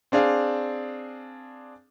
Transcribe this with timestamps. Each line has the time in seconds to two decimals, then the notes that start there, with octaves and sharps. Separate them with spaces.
0.12 C4 D4 G#4 F5